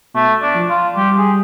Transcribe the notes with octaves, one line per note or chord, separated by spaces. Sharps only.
B2 A3
D4
F3
F4
G3 G4
G#4